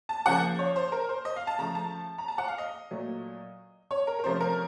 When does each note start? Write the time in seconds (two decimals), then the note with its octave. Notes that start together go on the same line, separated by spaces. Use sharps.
0.09 A5
0.26 C#3 F3 A#3 F#5
0.59 C#5
0.76 C5
0.92 A#4
1.09 C5
1.25 D#5
1.36 F5
1.47 A5
1.58 C#3 F3 A3 A#5
1.75 A5
2.18 A#5
2.28 A5
2.38 F#5
2.48 F5
2.58 D#5
2.91 A#2 F#3 A3
3.91 C#5
4.07 A#4
4.19 A#4
4.24 C3 F3 A3 C#4 C5
4.40 A#4